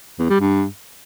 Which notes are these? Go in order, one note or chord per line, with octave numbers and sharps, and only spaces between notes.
E2
G3
G2